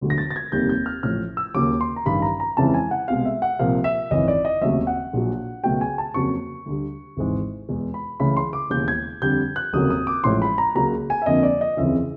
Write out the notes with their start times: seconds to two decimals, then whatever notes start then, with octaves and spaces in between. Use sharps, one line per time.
0.01 E1 D2 D3 F#3 A3
0.10 A#6
0.18 A6
0.31 A6
0.36 G#6
0.52 F1 D#2 D#3 G3 A#3 G6
0.69 G6
0.86 F6
1.03 A1 A2 F3 A3 F6
1.37 E6
1.55 D#2 C#3 F#3 A#3 D6
1.81 C6
1.96 A#5
2.06 A1 G2 D#3 B5
2.22 A#5
2.40 A#5
2.57 F2 C#3 E3 G#3 A5
2.74 G#5
2.91 F#5
3.08 C2 B2 G#3 F5
3.25 E5
3.42 F#5
3.59 C2 A#2 F3 A#3 F5
3.84 E5
4.11 G#1 F#2 C#3 E3 D#5
4.28 D5
4.45 D#5
4.62 F1 D#2 C#3 F#3 A3 E5
4.87 F#5
5.13 A#1 A#2 F#3
5.64 C#2 B2 F#3 A3 G5
5.81 G#5
5.98 A5
6.14 F2 C#3 F#3 A#3 C#6
6.66 D2 D3 G3
7.17 G#1 G#2 E3 G#3
7.68 E2 B2 G#3
7.94 B5
8.20 C#2 C#3 E3 A3 B5
8.37 C6
8.53 D6
8.70 E1 D#2 C#3 E3 G6
8.88 G#6
9.22 F2 D3 G3 G6
9.56 F#6
9.73 F1 D#2 C#3 F#3 A#3 D#6
9.90 D#6
10.07 D6
10.24 A1 A2 F3 G#3 C6
10.42 B5
10.58 A#5
10.75 C#2 C#3 F#3 A#3 A#5
11.10 G#5
11.22 E5
11.26 F2 D3 F3 A#3 D#5
11.43 D5
11.61 D#5
11.77 F#1 F2 C#3 E3 E5